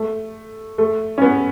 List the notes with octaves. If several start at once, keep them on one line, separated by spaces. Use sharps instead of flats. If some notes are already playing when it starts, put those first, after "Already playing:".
Already playing: A3
A3
C#4
B3